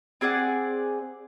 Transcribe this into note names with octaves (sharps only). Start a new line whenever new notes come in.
C4 G#4 D5 F#5